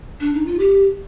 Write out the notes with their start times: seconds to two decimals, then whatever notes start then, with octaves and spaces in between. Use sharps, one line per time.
0.20 D4
0.34 D#4
0.46 F4
0.59 G4